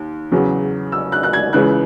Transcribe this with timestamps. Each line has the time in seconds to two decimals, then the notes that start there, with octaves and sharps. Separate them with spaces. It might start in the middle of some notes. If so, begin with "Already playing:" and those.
Already playing: D#2
0.32 E2 C#3 F#3
0.92 E6
1.12 F#6
1.23 F#6
1.33 G#6
1.53 C#2 C#3 E3 F#6